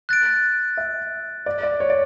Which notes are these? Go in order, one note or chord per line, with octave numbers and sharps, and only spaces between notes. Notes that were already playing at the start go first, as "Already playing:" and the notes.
F#6 A6 D7
E5
D5
D5
C#5
D5